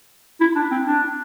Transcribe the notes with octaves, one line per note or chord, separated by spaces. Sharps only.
E4
D4
C4
D4